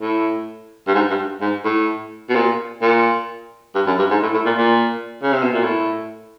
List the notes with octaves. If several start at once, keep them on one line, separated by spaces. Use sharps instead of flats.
A2
G2
G#2
G2
G#2
A2
B2
A#2
A#2
G2
F#2
G2
G#2
A2
A2
A#2
A#2
C#3
C3
B2
A#2
A2